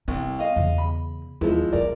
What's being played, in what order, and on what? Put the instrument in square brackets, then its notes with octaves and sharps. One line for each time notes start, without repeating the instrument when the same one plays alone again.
[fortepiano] C2 [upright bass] E4
[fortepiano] D#5 F5
[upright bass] E2 C#3
[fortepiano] B5
[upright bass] D#2 [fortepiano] F3 G#3 E4
[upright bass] A#1 G#3 [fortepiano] A#4 D5